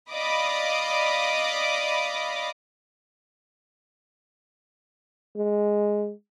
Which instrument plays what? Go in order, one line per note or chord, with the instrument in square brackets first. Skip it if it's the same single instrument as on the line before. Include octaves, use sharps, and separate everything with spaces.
[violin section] D5 D#5 F5 B5 D6 D#6
[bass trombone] G#3